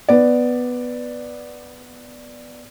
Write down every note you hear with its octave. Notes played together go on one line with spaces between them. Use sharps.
B3 D5